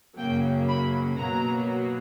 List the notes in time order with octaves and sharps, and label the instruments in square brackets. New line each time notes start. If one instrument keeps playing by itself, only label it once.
[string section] F#2 C#3 F#3 A#3 G5
B5
B2 F#3 A#3 A#5